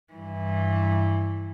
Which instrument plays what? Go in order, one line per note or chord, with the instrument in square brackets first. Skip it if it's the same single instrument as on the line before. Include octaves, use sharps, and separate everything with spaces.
[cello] G2 E3